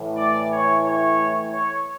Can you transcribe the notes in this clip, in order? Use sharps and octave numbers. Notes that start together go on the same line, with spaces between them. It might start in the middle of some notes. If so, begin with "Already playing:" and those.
Already playing: A2 E3
D5
C#5
C#5
C#5